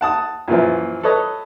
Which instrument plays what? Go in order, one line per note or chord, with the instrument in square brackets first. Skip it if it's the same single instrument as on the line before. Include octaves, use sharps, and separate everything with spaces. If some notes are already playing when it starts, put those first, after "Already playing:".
[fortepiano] F#5 A5 D#6
F#2 A#2 E3 F3
A4 B4 C#5 D#5